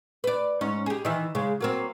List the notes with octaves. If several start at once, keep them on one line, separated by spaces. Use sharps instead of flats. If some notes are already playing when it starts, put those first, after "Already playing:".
B4 D5
G#2 C#4
G4 G#4
D#3 E3
C#3 G#3
F#3 A#3 C4